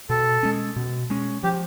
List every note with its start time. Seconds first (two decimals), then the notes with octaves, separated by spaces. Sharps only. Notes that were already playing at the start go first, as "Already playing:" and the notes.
0.10 B2 A4
0.43 G#3 C#4
0.76 B2
1.10 G#3 C#4
1.43 F3 G4